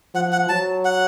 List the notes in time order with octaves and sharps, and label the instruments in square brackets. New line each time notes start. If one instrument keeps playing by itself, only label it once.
[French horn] F3 [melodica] F#5
[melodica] F#5
[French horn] F#3 [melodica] A5
[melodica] F#5